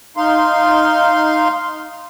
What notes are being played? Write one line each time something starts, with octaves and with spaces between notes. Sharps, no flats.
D#4 F5 C6